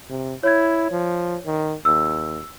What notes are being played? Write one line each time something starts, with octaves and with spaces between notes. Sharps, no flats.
C3
E4 C#5 G#6
F3
D#3
D#2 E6